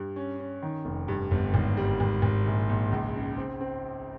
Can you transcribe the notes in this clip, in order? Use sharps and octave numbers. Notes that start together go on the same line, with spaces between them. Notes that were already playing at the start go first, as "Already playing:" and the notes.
Already playing: G2
C#4
C#4
D#3
F1
G2
G1
G#1
G3
G#1
G#1
A#1
A#1
C#2
C#3
C4
C4